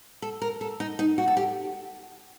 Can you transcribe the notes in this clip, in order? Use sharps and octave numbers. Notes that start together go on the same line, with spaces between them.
A4
A#4
A4
D#4
D#4
F#4
A4
G4